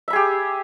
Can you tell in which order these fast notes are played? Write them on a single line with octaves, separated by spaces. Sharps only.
E5 B5 G#4 G4